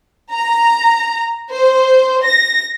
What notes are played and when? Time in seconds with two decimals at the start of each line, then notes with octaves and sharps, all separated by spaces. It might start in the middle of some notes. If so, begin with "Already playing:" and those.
0.33 A#5
1.51 C5
2.24 A#6